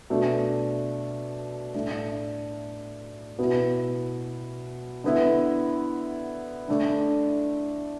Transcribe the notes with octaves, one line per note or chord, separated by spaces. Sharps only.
B2 A3 D4
A2 A3 D4
B2 B3 E4
D3 B3 E4
D3 A3 D4